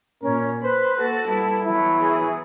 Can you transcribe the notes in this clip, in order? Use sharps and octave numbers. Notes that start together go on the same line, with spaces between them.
A#2 C#4 A#4
B4 C5 B5
A#3 F#4 A4 A6
G3 B3 E4 A5
E3 F#3 B3 E4
G#4